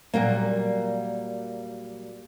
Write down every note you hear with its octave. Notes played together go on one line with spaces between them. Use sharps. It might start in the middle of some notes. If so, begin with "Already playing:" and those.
A#2 F#3 G3 A#3